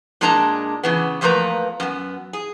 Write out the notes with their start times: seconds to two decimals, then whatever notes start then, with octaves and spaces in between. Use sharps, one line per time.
0.21 A#2 G#3 A#3 D4 A5 A#5
0.83 C#3 E3 B3
1.21 E2 F3 A3 A#3 B4 A#5
1.80 F#2 B3
2.33 G#4